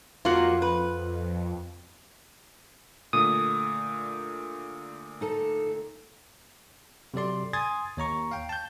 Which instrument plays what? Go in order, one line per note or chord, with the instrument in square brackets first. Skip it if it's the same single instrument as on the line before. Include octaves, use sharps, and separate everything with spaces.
[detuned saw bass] F2 [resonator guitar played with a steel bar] F#3 A#3 F#4 [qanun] F4 F#5
[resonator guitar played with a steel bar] B4
[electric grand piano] A#2 D3 A3 [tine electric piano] D#6
[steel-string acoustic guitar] D#4 A4 A5
[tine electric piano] C3 F#3 A4 D5 C6
G#5 C6 D#6 G#6 A6
D#2 C#5 A#5 C#6
F5 G5
A5 G6